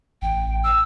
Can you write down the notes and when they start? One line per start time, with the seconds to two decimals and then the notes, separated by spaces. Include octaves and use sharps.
0.22 A1 G5
0.64 E6